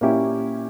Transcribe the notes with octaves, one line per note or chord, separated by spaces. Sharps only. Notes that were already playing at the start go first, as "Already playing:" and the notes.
A#2 A#3 C#4 E4 G4